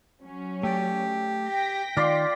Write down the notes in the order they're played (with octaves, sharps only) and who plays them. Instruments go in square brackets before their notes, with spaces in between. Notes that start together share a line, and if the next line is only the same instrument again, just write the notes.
[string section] F#3 C#4
[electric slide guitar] A3 D5 [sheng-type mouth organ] G4
[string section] G5 A#6 B6
[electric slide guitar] D#3 [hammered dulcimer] F4 D5 C6